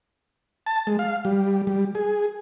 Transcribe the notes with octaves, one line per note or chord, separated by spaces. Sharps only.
A5
G#3
F5
G3
G3
G#4